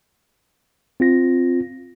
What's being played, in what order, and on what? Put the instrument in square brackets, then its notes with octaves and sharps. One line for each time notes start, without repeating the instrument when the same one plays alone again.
[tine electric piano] C4 F4 A#6